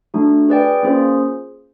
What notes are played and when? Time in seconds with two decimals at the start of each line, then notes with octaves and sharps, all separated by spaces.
0.14 A3 D4 F#4
0.49 G#4 B4 D5 G5
0.83 A#3 C#4 F4 G#4 C5